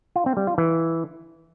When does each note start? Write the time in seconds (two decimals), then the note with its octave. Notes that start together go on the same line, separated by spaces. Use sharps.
0.16 F4
0.26 C4
0.37 G3
0.47 F4
0.58 E3